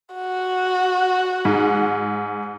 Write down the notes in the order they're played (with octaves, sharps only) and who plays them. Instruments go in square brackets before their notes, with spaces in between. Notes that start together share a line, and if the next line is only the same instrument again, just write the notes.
[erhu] F#4
[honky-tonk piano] G#2